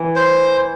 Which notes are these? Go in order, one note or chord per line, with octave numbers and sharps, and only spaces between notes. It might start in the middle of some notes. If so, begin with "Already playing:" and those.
Already playing: E3
C5